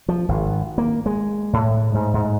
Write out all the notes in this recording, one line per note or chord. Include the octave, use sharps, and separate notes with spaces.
F3
G#1
A#3
G#3
A2
G#2
G#2